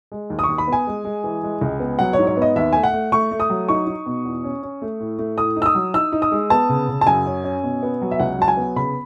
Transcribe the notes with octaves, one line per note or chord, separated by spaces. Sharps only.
G#3
D#2
D#6
C#6
D#2
B5
B3
G#5
G#3
G#3
E3
G#3
C#2
B3
F#3 F#5
C#5
G#2
C#5
B3 D#5
D#2 E5
A3 G#5
F#5
A3
A3 C#6
A3
D#6
F#3
D#4 C#6
D#4
B2
E2
C#4
C#4
A3
A2
A3
A2 D#6
D#4
E6
D#6
F#3
D#4 E6
D#4
D#6
G#3
B3 A5
C#3
C#3
A5
F#2 G#5
C#4
C#4
B2
B3
F#3
E5
C#2 F#5
F#3 A5
G#5
B3
C#3 B5